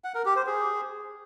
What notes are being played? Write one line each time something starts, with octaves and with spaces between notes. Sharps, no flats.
F#5
A#4
G4
C5
G#4